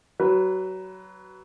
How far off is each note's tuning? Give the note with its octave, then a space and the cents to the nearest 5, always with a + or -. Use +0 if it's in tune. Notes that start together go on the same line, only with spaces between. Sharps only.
F#3 +25 B4 +0